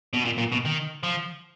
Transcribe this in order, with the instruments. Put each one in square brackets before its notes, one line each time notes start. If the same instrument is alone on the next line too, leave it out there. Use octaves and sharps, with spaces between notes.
[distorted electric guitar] B2
A#2
A#2
B2
D#3
F3